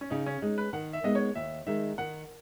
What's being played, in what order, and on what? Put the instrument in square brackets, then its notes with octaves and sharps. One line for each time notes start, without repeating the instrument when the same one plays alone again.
[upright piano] C#4
[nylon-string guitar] C#3 [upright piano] D#4
[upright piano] C#4
[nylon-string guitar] G#3 C#4 [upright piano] D#4
[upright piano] B4
[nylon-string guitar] D#3 [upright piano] F#5
[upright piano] E5
[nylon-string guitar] G#3 B3 D#4 [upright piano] D#5
[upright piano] C#5
[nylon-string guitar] D#2 [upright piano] E5
[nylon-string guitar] D#3 G#3 D#4 [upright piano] E5
[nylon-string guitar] D#3 [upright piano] F#5